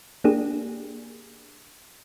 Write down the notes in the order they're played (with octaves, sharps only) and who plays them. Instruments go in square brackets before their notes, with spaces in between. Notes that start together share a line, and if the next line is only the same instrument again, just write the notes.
[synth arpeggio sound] A#3 D4 G4 G#4